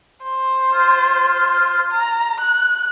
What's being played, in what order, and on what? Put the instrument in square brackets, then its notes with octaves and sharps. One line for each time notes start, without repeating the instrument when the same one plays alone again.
[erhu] C5
[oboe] F4
[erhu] A#5
F#6